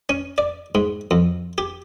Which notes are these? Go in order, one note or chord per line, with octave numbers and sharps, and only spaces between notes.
C#4
D5
G#2
F2
G4